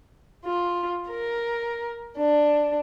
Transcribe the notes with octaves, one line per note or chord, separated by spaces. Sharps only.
F4
A#4
D4